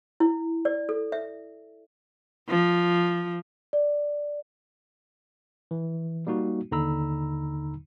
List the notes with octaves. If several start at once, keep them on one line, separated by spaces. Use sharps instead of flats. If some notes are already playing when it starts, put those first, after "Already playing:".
E4
D5
A4
E5
F3
D5
E3
G3 A#3 D#4 F#4
D#2 D3 D#4 A#5 B5 E6